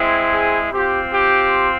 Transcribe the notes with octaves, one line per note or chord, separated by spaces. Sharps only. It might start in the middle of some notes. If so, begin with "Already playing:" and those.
Already playing: G#3 C4 E4
G#4
C4 F4 G4
G4